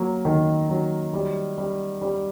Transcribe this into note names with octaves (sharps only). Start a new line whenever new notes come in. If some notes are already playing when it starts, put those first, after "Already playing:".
Already playing: F#3 A#3
D#3
F#3
G3
G3
G3